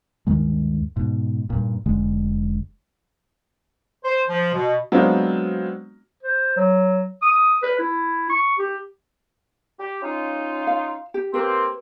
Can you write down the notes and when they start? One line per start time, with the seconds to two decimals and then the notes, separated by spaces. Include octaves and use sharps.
0.27 D2 G2 D#3 G#3
0.96 G#2 B2
1.50 G2 A#2
1.86 F1 D3 G#3
4.04 C5
4.28 F3
4.53 B2
4.92 F#3 G#3 B3 C4 D4 F4
6.23 C5
6.57 F#3
7.22 D#6
7.63 B4
7.79 E4
8.30 C#6
8.58 G4
9.80 G4
10.02 C#4 D#4 F4
10.67 F5
11.14 G4
11.34 A#3 C4 G4 B4